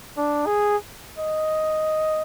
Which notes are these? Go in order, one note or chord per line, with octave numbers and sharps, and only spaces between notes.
D4
G#4
D#5